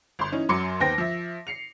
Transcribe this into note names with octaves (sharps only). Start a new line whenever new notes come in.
G1 C6
E3 C#4 D#4
F#2 F#3 C6 D6 C#7
D#2 B3 C5 G5 A#6
F3 E5
C7 C#7 F7